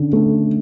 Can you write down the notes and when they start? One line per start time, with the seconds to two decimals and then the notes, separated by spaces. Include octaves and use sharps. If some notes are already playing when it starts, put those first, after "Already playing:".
Already playing: D3 C#4
0.13 A3